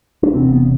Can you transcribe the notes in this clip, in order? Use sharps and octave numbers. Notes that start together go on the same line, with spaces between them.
D4
E1 E2 C3 C4
B3